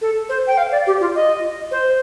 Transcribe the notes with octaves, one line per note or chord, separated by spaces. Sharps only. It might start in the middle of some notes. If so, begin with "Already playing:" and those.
A4
C5
G5
F5
D5
G4
F4
D#5
C5